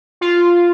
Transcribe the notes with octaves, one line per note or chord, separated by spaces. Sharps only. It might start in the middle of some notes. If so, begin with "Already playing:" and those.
F4